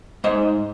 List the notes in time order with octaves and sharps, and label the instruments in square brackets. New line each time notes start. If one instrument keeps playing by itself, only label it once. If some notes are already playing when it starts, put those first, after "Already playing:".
[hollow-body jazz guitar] G#2 C5 D#5